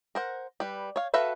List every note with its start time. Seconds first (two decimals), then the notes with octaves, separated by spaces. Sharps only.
0.15 A#4 C5 F#5
0.60 G3 B4
0.96 C#5 F5
1.14 F#4 A4 B4 E5 F5